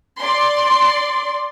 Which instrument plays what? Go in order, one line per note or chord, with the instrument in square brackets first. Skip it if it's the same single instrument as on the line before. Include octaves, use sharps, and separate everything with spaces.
[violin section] D5 C6